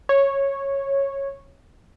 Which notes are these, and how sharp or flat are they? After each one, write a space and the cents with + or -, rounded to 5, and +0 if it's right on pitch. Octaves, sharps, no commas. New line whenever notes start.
C#5 -10